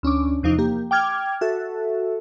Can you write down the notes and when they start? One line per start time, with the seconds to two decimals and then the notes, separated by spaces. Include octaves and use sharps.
0.03 D2 C#4 D4 D6
0.43 E2 C3 F3 D#4
0.58 A#3 G4
0.91 G5 D6 F6 G#6
1.41 F#4 A4 E5